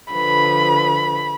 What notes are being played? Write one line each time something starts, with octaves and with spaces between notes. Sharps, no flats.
D3 F3 B4 B5